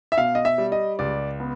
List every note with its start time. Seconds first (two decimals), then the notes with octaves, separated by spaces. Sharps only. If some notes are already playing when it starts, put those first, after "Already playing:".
0.12 E5
0.18 B2 F5
0.35 D#5
0.45 E5
0.58 G3
0.72 D#5
0.99 C#2 D5
1.40 B3